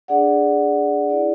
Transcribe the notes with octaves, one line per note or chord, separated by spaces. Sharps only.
D4 G#4 D5 F#5
E4 G#4 D5